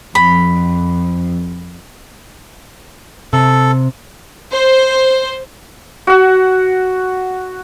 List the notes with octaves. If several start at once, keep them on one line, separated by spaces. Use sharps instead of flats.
F2 B5
C3 A4
C5
F#4 F#5